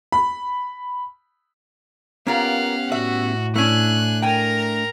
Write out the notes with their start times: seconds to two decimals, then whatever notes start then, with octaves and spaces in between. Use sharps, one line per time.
0.12 B5
2.27 A#3 B3 C#4 F4 G4 A#4 F5 F#5
2.92 A2 F#4 E5
3.56 A3 C#4 D4 E4 G#5 F#6
4.22 A#4 G5 G#5 A#5